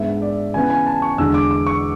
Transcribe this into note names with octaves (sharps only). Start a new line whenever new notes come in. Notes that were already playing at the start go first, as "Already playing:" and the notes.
Already playing: G#2 G#3 B3 D4 E5
D5
C#3 E3 B3 G#5
G#5
A5
C#6
E2 D3 G#3 D4 E6
D6
D6
C#6